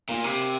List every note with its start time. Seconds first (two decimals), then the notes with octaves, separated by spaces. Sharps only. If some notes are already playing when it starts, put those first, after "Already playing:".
0.09 A#2 A#3
0.24 C3